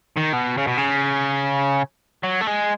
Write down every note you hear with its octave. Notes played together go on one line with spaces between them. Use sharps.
D#3
B2
C#3
B2
C#3
F#3
A3
G#3